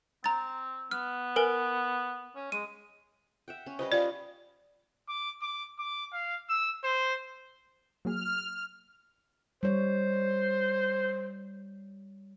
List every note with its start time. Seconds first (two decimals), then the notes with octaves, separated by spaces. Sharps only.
0.24 C4 A#5 A6
0.91 B3 F6
1.36 A#4 B4 G#5
2.36 C#4
2.52 G#3 D#7
3.48 E5 F#5 G5
3.66 C#4
3.79 G3 B4 C5 D#5
3.92 F4 G4 D5 F5
5.08 D6
5.42 D6
5.79 D6
6.13 F5
6.49 E6
6.83 C5
8.05 F#3 A#3 G#4 F6
9.63 G3 C5 C#5